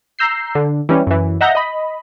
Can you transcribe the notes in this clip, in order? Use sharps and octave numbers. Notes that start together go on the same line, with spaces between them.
A#5 E6 G6 C7
D3
E3 G3 C#4
F#2 E3
D#5 E5 F#5 A#5 G6 A#6
D#5 B5